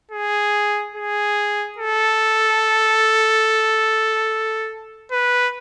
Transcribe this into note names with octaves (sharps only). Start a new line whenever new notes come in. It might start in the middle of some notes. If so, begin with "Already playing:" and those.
G#4
G#4
A4
B4